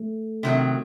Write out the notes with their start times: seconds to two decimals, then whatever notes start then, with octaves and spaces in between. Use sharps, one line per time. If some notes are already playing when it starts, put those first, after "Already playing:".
Already playing: A3
0.43 C3 D#3 F#3